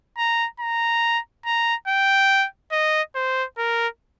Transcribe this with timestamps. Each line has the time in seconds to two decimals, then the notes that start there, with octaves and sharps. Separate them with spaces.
0.18 A#5
0.60 A#5
1.45 A#5
1.87 G5
2.72 D#5
3.15 C5
3.58 A#4